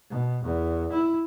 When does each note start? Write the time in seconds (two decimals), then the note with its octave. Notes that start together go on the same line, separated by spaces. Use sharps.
0.10 B2
0.44 E2
0.92 E4